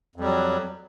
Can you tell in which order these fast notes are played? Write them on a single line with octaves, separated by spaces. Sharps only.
F2 G3 F#3